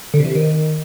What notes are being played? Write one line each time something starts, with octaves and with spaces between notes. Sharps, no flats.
D3
C3
E3
C3
D#3